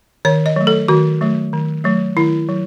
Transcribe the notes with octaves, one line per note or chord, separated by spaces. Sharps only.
D#3 C#5
D#5
F#3 A3
A4
D#3 F#4
F#3 A3
D#3
F#3 A3
D#3 E4
F#3